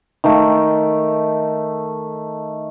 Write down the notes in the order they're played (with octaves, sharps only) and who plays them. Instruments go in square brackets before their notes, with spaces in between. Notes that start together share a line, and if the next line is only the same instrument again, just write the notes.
[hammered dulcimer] D#3 A3